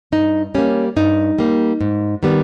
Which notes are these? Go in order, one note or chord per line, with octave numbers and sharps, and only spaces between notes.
G2 D#4
G3 A#3 C#4
G2 D#4
G3 A#3
G#2
D#3 G3 B3